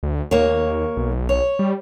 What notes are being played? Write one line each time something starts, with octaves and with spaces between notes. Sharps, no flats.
D2
D#2 A#3 C#5
B1
C#5
G3